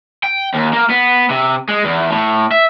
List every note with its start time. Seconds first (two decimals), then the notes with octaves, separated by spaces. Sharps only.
0.24 G5
0.54 D#2
0.74 A#3
0.91 B3
1.30 C3
1.69 G#3
1.85 E2
2.10 A2
2.52 E5